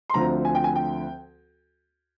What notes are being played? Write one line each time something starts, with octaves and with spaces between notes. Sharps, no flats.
C6
D2 D3 F3 C4 A#5
G#5
G5
G#5
G5